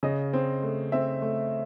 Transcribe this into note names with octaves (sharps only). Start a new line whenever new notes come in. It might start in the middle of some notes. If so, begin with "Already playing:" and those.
C#3 D#5
C4
A3
C4 E5
A3